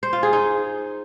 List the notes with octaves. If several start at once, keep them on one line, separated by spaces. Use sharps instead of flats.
C5
F4
G#4
D#4